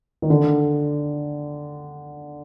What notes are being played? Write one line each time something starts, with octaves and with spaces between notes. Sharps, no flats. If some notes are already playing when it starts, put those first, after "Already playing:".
D#3
D3